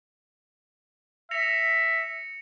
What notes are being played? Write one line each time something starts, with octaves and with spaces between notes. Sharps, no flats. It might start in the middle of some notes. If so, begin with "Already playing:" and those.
E5 A#6 C#7 F7